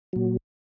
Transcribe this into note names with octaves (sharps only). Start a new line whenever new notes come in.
A#2 F#3